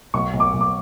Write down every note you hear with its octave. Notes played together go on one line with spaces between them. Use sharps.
B1 C#6
B1
D6
B1
D6